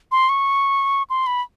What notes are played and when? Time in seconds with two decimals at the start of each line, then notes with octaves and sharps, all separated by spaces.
0.12 C6
0.29 C#6
1.10 C6
1.27 B5